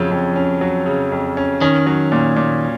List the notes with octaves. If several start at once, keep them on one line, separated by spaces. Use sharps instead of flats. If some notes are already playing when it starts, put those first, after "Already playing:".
Already playing: F2 C#3 F3 F#3 C#4
F2
C#4
F#3
C#3
F2
C#4
D#3 C#4
F#3
A#2
A#2